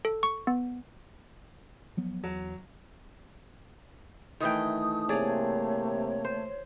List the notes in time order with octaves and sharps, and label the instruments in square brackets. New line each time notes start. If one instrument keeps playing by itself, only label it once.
[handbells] A4
C#6
B3
[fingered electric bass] F3 F#3 B3
[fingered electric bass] E2 [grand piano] F#3
[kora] D#3 E3 G5 [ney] A3 [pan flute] D#6
[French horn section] C3 A#3 [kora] G#4 D5 [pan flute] C#5
[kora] C5